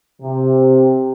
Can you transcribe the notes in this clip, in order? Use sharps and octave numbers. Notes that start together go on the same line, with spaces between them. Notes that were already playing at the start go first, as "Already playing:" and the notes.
C3